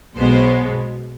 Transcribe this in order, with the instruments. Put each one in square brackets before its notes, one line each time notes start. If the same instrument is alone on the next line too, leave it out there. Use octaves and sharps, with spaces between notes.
[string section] B1 B2 G#3 B3 C5